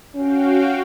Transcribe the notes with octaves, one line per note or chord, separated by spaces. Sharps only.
C#4 F#4 F5 G5